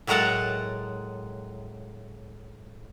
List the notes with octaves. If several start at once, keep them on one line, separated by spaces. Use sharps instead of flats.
A2 F#3 G#3 A#4 F#5 A5